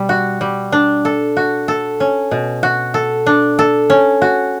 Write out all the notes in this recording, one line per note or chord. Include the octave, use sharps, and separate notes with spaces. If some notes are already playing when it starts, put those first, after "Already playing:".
Already playing: B2 G3
F#4
G3
D4
A4
F#4
A4
C#4
B2
F#4
A4
D4
A4
C#4
F#4